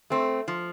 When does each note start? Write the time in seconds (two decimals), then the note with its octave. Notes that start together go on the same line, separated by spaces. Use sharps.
0.10 A3 C4
0.48 F3